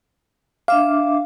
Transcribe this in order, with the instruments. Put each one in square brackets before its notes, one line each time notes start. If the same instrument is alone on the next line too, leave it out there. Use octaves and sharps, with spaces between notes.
[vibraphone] D4 E5 D6 [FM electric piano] F5